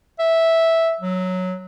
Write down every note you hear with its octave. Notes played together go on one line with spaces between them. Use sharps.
E5
F#3